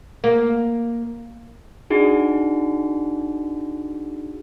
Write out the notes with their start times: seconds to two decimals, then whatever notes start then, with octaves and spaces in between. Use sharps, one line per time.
0.24 A#3
1.90 D4 D#4 F#4 G#4